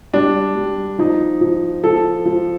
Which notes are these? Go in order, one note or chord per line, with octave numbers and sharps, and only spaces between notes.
G3 D4
G3
F3 D#4
F3
F3 A4
F3